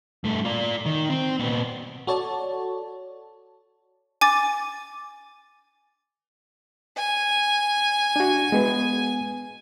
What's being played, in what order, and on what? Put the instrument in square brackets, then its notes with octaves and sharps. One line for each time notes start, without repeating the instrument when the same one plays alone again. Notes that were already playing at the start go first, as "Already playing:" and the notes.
[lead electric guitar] G2 A3
F4 D5
D#3
C4
A#2 B3
[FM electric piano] F#4 A4 C#5 D5 A5
[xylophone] G#5 D6 A6
[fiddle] G#5
[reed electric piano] D4 F#4
G#3 B3